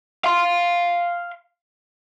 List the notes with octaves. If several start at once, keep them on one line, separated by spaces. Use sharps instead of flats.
F5 C6